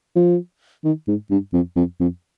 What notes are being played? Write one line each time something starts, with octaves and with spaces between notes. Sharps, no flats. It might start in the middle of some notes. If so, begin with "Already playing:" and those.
F3
D#3
G#2
G2
F2
F2
F2